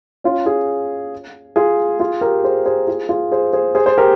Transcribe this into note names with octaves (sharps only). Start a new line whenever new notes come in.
C#4 F4
F4 G#4
F4 G#4
F4 G#4
G4 A#4
G#4 C5
G#4 C5
F4 G#4
F4 G#4
G#4 C5
G#4 C5
G#4 C5
G#4 C5
G4 A#4